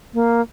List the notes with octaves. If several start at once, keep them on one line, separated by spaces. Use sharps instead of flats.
A#3